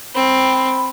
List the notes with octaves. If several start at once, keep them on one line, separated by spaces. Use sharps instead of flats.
C4 B5